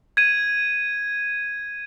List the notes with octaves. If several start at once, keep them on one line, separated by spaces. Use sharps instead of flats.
G#6 D#7